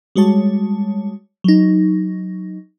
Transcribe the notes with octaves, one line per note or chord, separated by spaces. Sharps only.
G3 G#3 F#4 C#5 A5
F#3 D#4